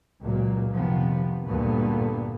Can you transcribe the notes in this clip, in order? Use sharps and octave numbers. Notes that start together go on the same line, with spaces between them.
C#2 A#2 F#3 A#3
F2 C3 D#3 F3 B3
D2 G2 A#2 D3 A#3 B3